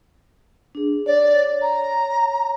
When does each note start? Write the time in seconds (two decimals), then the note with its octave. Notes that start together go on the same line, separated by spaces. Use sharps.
0.75 D4 G#4
1.06 C#5 D5
1.61 A#5